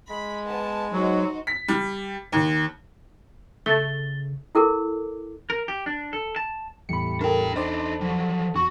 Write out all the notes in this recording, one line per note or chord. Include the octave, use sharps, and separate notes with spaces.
G#3 B5
B3 A5
F#3 D#4 F#4 C5
B6
G3
D#2
C#3 A3 A6 G7
E4 A4 A#4 D6
A#4
G4
D4
A4
A5
E2 A2 G3 B5 C#7
D4 A4 A#4 G5
D4 D#4 A4 C5 D5
F3 F#3
E2 F#4 C#6